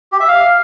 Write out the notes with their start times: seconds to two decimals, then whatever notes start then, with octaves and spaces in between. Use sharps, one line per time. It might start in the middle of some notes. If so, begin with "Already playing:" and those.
0.12 G4
0.20 E5
0.28 F5